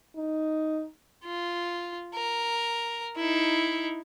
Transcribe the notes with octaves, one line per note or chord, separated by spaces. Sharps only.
D#4
F4
A#4
D#4 E4